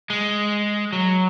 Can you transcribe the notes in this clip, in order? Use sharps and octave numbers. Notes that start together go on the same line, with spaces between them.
G#3
F#3